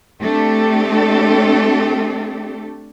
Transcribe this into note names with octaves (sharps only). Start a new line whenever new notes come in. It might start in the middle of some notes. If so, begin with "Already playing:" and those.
A3 C4 D4 G4 A4